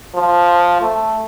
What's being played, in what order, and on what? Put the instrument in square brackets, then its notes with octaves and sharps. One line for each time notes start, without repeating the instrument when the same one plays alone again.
[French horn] F3
A3